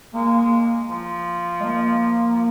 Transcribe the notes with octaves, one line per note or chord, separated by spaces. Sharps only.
G#3 A#3
G#3
F3
G#3
A#3
F3